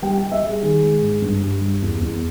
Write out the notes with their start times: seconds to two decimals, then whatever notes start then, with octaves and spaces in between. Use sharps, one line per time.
0.02 G3 G5
0.18 G5
0.23 G3
0.32 E5
0.42 G3
0.47 G#4
0.62 D#3 G#4
0.83 G#3
1.02 G#2
1.22 G2
1.42 G3
1.61 G3
1.82 E2
2.01 E2